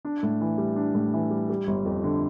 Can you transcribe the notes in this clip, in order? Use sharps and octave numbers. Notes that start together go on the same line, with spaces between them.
D4
A2
E3
G3
D4
A2
E3
G3
G3
G1
F2
D3